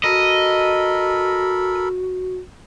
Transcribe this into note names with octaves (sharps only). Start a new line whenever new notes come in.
F#4 A4 A#4 D#5 B5